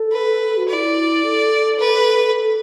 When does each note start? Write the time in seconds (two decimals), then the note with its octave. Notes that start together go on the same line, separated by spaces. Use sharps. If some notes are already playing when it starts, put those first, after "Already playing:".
Already playing: A4
0.12 B4
0.57 F#4
0.68 E4 F#4 D5
1.24 A4
1.80 B4
2.35 A4